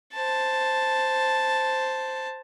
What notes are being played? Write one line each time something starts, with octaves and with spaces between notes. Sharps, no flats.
C5 A5